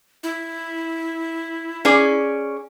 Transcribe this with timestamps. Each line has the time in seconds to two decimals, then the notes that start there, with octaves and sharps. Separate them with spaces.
0.23 E4
1.85 C#4 G#4 D5